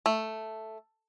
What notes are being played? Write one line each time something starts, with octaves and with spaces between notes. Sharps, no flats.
A3